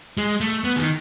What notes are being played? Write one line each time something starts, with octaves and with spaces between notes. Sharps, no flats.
G#3
A3
B3
D#3